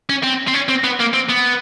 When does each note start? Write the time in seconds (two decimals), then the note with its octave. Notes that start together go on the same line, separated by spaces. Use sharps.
0.09 C#4
0.24 C4
0.48 C4
0.55 C#4
0.69 C4
0.84 B3
1.00 A#3
1.14 C4
1.30 B3